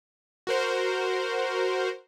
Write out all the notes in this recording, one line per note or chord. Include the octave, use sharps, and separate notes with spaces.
F#4 A#4 C5